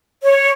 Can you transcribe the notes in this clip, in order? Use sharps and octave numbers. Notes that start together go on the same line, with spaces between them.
C#5